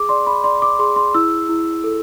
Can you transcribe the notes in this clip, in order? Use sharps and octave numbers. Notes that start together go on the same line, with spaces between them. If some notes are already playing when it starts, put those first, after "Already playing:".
Already playing: G#4 D6
D5 C6
B5
D5 C6
D6
G#4 C6
C6
E4 E6
E4
A4